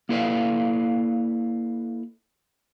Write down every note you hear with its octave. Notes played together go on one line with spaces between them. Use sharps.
A#3 E4 A4 B4 D5 F5